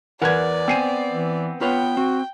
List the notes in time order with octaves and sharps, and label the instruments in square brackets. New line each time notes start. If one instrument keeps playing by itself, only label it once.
[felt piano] E2 B4 G#6 [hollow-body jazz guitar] A#4 F#5 [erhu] D5
[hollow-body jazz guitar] B3 G#5 [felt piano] C4 C7 D#7
[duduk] E3
[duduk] B3 [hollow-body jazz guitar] F4 B4 C#5 [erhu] G5
[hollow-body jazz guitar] C4 [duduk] F#4